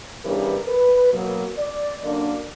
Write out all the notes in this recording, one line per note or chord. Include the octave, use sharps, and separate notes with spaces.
C#3 E3 G3 B3 D4 A#4
B4
B2 F#3 A#3
D5
F#2 D3 A#3 D4 D5